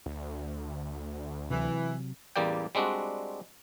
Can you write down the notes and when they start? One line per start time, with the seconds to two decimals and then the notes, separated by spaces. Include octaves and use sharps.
0.06 D2
1.50 C3 E3 F#3
2.36 A1 E2 G3 A#3 D5 G5
2.75 G3 G#3 C4 D4 F#4